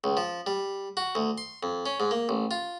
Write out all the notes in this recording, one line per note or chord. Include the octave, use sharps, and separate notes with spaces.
C#2
F3
G3
F#4
D2
C6
F2
C#4
G#2
A#3
A1
F4